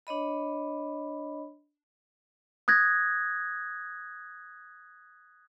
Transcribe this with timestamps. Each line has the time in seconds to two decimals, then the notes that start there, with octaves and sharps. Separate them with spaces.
0.07 D4 C#5 D#5 B5
2.68 D#6 F#6 G#6 A#6